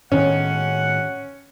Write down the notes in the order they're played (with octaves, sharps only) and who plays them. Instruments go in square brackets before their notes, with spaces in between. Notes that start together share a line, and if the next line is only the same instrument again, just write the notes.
[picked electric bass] A2 D#3 [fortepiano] C#4 [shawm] F#5